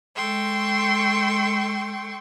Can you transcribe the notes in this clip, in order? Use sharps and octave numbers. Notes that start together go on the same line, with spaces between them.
G#3 A4 G5 C6 C#6